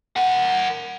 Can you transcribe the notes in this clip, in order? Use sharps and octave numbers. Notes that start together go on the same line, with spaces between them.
A#4 F#5